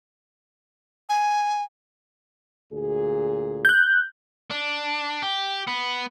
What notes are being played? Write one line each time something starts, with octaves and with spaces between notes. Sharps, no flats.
G#5
D2 A#2 G#4
F#6 G6
D4
G4
B3